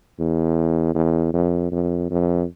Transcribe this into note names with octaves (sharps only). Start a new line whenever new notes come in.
E2
E2
F2
F2
F2